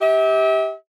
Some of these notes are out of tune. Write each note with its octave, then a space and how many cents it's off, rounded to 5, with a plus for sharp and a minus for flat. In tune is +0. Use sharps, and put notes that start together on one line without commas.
G4 +0 E5 -40